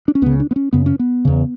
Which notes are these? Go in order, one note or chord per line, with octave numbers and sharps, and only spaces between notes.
D4
C#4
C#2 C#3 B3
D4
B3
C#4
F#2 C#3 B3
C#4
B3
E2 C#3